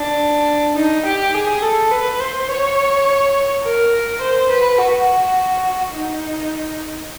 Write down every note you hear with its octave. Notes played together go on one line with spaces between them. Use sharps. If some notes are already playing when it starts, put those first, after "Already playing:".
Already playing: D4
D#4
G4
G#4
A4
B4
C5
C#5
A#4
C5
B4
F#4
D#4